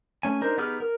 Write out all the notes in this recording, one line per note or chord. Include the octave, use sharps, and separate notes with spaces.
A3 C#4 G#5
D4 D#4 A#4 C5
B3 D#4 G4 G#4 F6
A#4